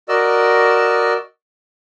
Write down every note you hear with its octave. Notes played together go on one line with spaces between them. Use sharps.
F#4 A#4 D5 D#5 E6